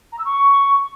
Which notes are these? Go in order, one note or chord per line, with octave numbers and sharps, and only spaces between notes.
A#5
E6
C#6